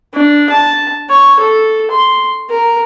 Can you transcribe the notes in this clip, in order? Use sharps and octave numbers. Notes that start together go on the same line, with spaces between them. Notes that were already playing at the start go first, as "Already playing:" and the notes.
D4
A5
C#5
A4
C6
A#4